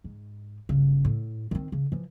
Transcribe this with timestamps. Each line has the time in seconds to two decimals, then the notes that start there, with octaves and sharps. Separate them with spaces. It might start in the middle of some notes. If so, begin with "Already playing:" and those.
0.04 G#2
0.69 G1 C#3
1.05 A2
1.51 D#3 C4
1.72 C#3
1.92 E3 F3